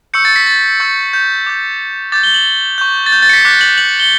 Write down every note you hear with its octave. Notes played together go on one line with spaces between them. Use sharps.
C#6 E6 G6 C#7
A6
B6
A6
C#6 E6 G6
G6
D6 G6
D6 G6 A6
G7
F#7
C#6 G6
A6
G6
A6
C#7
B6
D6 F#6 B6
F#7
F#7
F#7
G7